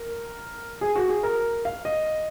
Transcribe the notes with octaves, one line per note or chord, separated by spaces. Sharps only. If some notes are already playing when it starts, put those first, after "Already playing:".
Already playing: A#4
G#4
F#4
G#4
A#4
F5
D#5